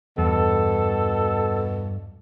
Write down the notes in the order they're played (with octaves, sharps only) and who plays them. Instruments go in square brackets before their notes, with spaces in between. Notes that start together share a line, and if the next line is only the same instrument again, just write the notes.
[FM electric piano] E2 [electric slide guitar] G2 [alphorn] B2 [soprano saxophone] A4